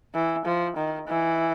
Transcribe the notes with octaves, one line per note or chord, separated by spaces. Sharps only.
E3
F3
D#3
E3